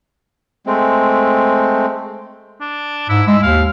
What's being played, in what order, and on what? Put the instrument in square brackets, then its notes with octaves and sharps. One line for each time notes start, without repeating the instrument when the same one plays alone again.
[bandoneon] G#3 A3 C4
[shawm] D4
[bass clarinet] G#2 [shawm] E4
[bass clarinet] G#3 [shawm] E4
[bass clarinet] D#2 [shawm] F5